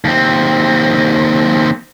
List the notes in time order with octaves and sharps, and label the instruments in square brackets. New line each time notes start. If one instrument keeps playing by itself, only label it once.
[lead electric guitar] D#2 C4